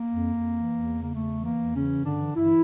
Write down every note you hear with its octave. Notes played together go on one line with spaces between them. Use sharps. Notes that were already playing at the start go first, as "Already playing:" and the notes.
Already playing: A#3
F2
F2
E3
E2
C#3
A#3
E2 A3
E3
A#3
E2
C#3 E3 C#4
G2
D3 D4
E3
G2 E3 E4